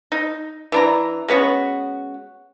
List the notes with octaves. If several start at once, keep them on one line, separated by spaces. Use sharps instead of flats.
D#4
E3 D4 A#5
G#3 B3 C#4 F#4